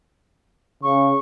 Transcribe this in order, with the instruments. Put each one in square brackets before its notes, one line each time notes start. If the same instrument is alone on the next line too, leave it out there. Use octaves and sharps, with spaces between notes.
[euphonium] C#3 [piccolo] C#6